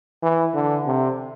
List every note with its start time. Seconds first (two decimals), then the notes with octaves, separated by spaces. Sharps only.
0.23 E3
0.54 D3
0.87 C3